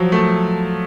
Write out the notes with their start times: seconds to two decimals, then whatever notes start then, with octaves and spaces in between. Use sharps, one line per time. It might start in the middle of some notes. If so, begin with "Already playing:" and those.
Already playing: F3 F#3
0.12 A3